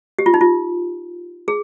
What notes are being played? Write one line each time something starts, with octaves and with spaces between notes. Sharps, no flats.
G4
F4
D#4
F4
G#4